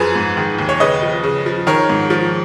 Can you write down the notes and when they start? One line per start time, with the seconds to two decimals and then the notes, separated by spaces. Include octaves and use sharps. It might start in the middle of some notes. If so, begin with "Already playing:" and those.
Already playing: F#2 F3 G#4 B4
0.15 G#2
0.37 D#3
0.58 D#2
0.69 C#5
0.80 C#3 B4 D#5
1.02 F3
1.24 C#3
1.46 F3
1.67 D#3 A#4 C#5
1.90 G#2
2.10 F3